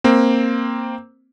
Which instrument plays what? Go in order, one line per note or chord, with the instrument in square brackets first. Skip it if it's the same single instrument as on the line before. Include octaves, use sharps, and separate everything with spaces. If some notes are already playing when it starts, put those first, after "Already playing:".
[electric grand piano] A#3 C4